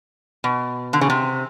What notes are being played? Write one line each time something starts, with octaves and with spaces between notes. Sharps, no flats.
B2
D3
C#3
C3